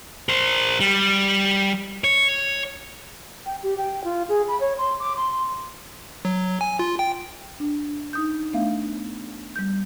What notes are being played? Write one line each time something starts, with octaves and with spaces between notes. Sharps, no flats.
A#4 C5
G3
C#5
G5
G4
G5
F4
G#4
B5
C#5
C6
D6
C6
F#3
G#5
F4
G5
D4
D#4 D#6 G6
A3 B3 D4 E5 F5
G3 G6